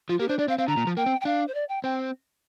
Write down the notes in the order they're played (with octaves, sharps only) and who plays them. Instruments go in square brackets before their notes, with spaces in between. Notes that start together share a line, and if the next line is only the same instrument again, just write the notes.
[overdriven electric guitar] F3 [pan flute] F4
[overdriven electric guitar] A#3 [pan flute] G4
[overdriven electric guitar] D4 [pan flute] C5
[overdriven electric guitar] D4 [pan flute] D5
[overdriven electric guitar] C4 [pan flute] F5
[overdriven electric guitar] C4 [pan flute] F5
[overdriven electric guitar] D3 [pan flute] A#5
[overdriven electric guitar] A#2
F3
[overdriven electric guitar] A#3 [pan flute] G5
[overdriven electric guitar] C4
[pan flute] G5
[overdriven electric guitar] D4 [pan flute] F5
[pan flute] C5
D5
G5
[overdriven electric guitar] C4 [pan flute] G5